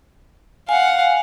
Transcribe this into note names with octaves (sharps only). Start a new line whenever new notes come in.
F5 F#5 G#5